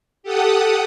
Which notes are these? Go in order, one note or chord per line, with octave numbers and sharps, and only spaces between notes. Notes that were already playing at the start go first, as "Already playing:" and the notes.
G4 A4 F#5 D#6